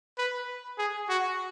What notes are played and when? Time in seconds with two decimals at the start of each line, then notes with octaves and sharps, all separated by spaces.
0.18 B4
0.78 G#4
1.09 F#4